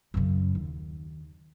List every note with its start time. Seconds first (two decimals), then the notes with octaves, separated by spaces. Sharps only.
0.14 F#2 C#3
0.55 D#2